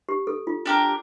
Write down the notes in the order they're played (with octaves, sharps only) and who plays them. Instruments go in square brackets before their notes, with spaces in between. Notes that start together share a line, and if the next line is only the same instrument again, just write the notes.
[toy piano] G4
A4
F4
[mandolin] D4 G4 A#4